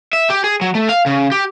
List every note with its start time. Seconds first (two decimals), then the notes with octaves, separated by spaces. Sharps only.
0.13 E5
0.30 G4
0.44 G#4
0.61 F#3
0.75 A3
0.89 F5
1.06 C#3
1.32 G4